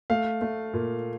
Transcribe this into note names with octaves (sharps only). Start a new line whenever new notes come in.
A3 F5
A3
A#2